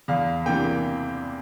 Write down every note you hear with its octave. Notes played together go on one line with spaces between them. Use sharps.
E2 F5
C3 E3 A#3 G5